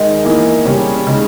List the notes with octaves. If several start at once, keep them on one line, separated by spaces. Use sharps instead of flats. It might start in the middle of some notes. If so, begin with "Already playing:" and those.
Already playing: D#3 G#3 D#4
E3 A#3 D#4
C#3 G3 C#4
C#3 G#3 D#4